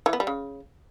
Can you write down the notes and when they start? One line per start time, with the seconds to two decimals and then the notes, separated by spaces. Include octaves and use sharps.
0.06 E3
0.13 B3
0.20 G3
0.27 C#3